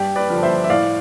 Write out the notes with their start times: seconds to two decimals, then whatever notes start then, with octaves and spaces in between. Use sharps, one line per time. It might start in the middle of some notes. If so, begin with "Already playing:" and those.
Already playing: G2 G4
0.16 B4 D5
0.30 D3 F3
0.43 C5 E5
0.64 E5
0.70 A2 D5 F5